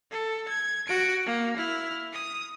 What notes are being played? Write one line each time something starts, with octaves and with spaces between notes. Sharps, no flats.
A4
G#6
F#4 D7
A#3
E4 F6
D#6